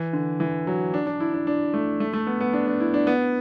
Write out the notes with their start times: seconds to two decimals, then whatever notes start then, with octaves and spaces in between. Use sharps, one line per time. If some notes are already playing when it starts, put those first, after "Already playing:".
Already playing: E3
0.13 D3
0.40 E3
0.67 F#3
0.94 D4
1.07 D4
1.20 E4
1.34 D4
1.47 D4
1.74 A3
2.00 A3
2.13 A3
2.27 B3
2.40 B3
2.53 D4
2.67 D4
2.80 E4
2.94 D4
3.07 B3